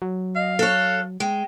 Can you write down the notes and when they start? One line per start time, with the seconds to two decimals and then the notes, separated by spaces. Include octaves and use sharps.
0.02 F#3
0.35 D#5 F5
0.59 A4 C#5 F#6
1.20 G#3 G5